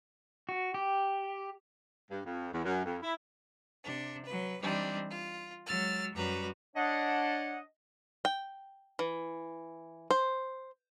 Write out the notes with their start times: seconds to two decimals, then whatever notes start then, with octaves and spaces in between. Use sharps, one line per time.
0.49 F#4
0.74 G4
2.10 G2
2.26 F2
2.53 E2
2.65 F#2
2.85 F2
3.02 E4
3.83 C3 D4
4.26 F#3 B4
4.61 E3 G3 C4 D4 D#4
5.10 F4
5.66 F#3 G#3 E6 F6 A6
6.14 F#2 G3 F#4 B4 A#5
6.76 D4 C#5 D#5 F#5
8.25 G5
8.99 E3
10.11 C5